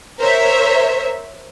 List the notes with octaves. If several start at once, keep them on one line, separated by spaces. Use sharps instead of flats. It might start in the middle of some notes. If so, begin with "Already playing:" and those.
A#4 C5 C#5 E5